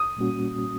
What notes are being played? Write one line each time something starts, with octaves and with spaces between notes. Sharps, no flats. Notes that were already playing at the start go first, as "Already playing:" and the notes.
Already playing: D#6
A#2 G3 A#3 C#4 F#4